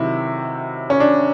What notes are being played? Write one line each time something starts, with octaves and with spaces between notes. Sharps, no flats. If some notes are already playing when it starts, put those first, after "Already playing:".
Already playing: C3 D#3 F#3 E4
C#4
D4